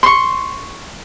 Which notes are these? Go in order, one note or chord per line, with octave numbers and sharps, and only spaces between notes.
C6 C#6